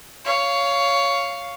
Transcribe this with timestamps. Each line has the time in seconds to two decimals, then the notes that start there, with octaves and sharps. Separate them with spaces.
0.25 C#5 F5